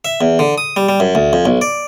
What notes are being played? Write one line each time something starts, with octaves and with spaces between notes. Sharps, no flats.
E5
E2
D3
D#6
G3
G3
F#2
D2
F2
B1
D5